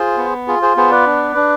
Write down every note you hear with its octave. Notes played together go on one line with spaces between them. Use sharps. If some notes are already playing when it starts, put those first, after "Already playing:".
Already playing: F4 G#4 C5
B3
F4 G#4
G#4 C5
B3 G#4 C5
B4 D5
D4
D4